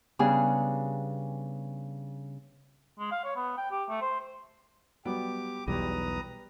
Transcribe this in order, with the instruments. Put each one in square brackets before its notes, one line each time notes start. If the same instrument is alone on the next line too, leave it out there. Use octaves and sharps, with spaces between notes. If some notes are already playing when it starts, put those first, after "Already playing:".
[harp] C#3 G3 B3 D4 G#4
[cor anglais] G#3
F5
C#5
B3
G5
G4
A3
C5
[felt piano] F#3 G3 B3 [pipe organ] G4 D6
[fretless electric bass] B1 E2 [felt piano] G3 G4 [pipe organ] B4 A#5 D#6